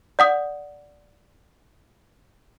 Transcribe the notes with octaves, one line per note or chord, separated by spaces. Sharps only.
D5 F#5 D#6